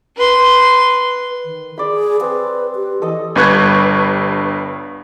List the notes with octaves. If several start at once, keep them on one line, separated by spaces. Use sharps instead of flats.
B4 C6
D#3
G#4 D5 B5
C4 B4
G4
E3 A4 D#5
G1 G2 B4 C#6 F#6 G#6